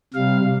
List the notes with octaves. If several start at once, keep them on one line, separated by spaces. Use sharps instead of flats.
C3 G3 F5